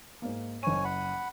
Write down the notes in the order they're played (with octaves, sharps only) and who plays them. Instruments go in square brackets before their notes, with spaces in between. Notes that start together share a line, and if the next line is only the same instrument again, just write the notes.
[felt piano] G#2 A#3
[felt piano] F#1 D#7 [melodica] C#5 G#5
[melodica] F#5 B5